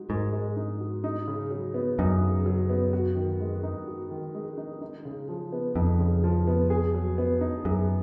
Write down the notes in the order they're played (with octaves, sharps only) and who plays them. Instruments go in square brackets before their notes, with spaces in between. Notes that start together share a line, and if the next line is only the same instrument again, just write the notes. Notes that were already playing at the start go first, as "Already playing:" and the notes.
Already playing: [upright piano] G#3 D#4 F#4
[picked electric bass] G#2 [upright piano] A#4
[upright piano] G#3
D#4
F#4
D#4
C#3
F#3
B3
[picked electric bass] F#2 [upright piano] D#4
[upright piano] C#3
F#3
B3
F#4
D#3
G#3
D#4
F#4
D#3
G#3
D#4
D#4
C#3
F3
B3
[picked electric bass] F2 [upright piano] D#4
[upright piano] C#3
F3
B3
G#4
F#3
B3
D#4
[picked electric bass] F#2 [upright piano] G#4